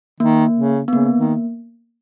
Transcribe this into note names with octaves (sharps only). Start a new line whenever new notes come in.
D#3 A#3
C#3
B3
C#3 A#3
D#3